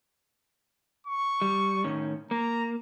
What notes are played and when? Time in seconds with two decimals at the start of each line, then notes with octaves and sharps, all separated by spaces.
1.07 C#6
1.42 G3
1.84 A2 D#3 C#4
2.31 A#3 A#5